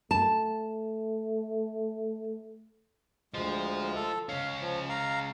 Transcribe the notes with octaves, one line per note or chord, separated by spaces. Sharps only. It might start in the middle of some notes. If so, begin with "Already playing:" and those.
A3 A5
D2 F3 G#3
A4
C#2 C#4 F5
F3
F5 A#5